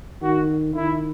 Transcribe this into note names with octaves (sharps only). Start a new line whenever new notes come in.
D#3 F#4
D#3 E4